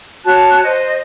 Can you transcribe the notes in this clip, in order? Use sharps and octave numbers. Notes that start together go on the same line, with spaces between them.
F#4 C#5 A5 F#6
C5 D#5